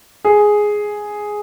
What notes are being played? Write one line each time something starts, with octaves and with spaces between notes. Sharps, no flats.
G#4